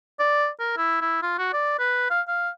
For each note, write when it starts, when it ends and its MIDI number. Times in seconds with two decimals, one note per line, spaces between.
0.20 0.48 74
0.60 0.76 70
0.77 1.01 64
1.01 1.20 64
1.22 1.37 65
1.38 1.49 66
1.53 1.77 74
1.79 2.08 71
2.10 2.21 77
2.28 2.50 77